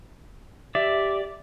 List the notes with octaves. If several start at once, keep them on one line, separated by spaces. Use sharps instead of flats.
G4 D5 E5